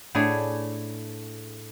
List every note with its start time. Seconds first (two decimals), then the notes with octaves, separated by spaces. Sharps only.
0.15 A2 A3 D4 G#4 C#5 G#5